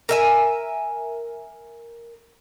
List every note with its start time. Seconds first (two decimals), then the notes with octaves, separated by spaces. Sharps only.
0.09 A#4 E5 G#5